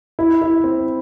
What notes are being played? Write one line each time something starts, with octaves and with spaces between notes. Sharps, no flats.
E4
E4
C4